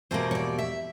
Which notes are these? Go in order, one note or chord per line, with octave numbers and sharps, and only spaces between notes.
E2 B2 G3 A#3 C5
C#5
D5
E5